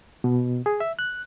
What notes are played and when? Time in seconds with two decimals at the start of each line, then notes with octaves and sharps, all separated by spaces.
0.24 B2
0.66 G#4
0.80 E5
0.99 F#6